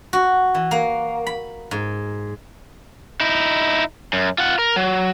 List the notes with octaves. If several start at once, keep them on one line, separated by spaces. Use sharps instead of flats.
F#4
E3
A#3
B5
G#2
D#4 E4
F#2
F4 F#5
A#4
F#3